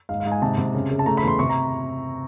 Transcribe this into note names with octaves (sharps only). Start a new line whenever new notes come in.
G#2 F5
F5
G#2
G#5
C3 A5
C3
C#3
C#3
A5
A3 A#5
B5
E2
C6
C3 C#6
A#5